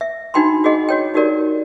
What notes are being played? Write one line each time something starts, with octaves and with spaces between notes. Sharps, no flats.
E5
D4 D#4 F#4 G5 B5 C6
F#4 G#4 D#5 F#5
F#4 C#5 G5
D#4 F#4 G4 A#4 D5